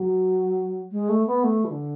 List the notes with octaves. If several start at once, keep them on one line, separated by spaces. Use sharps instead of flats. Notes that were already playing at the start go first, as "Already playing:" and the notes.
Already playing: F#3
G#3
A3
B3
A3
E3
D3